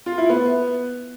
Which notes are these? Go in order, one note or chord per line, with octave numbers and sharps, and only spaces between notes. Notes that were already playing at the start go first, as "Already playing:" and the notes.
F4
E4
B3